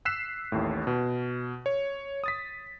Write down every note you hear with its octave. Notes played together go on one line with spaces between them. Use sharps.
E6 F#6 B6 C7 E7
A1 D#2 A2
B2
C#5
D#6 A6 B6